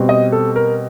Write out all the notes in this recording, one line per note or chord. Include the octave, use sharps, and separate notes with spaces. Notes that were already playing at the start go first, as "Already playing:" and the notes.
Already playing: B2 G3 C4
D#5
A4
A#4